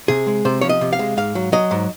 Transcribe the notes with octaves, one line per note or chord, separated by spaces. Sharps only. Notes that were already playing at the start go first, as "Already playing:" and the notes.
C3 G#4
G#3
C3 C5
F3 C#5
D#5
C3
F5
G#3
G#2 F5
F#3
F#3 D#5
G#2